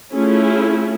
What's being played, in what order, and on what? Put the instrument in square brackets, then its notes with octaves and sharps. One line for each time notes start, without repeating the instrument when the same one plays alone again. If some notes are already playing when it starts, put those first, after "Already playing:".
[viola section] A3 C#4 E4 F4 G#4